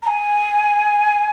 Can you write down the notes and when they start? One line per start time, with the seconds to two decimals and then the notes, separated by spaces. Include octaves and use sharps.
0.03 A#5
0.07 G#5